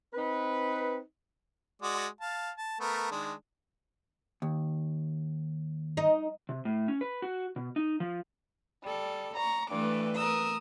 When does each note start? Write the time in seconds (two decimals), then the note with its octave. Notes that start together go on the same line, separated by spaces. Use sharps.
0.14 C4 D#4 B4
1.82 G#3 F#4 D5
2.21 F5 A5
2.57 A5
2.80 A3 B3 A#4
3.11 D#3 G#3 D4
4.42 D#2
5.97 D#4
6.49 C3
6.65 A2
6.88 C#4
7.01 B4
7.22 F#4
7.56 B2
7.76 D#4
8.00 F3
8.83 G3 A4
9.36 A#5 C#6
9.70 G2 E3 A3 B4 D6
10.15 A#4 D#6 E6